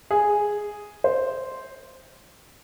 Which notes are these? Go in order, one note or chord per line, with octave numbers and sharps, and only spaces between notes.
G#4
C5